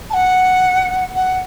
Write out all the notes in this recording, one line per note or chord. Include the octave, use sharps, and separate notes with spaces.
A5
F#5
F#5